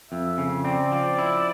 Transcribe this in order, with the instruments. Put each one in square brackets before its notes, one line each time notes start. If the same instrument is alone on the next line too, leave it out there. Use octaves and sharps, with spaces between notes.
[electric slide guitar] F2 [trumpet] E5
[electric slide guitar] C#3
[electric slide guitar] C4 [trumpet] D5
[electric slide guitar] F3
E4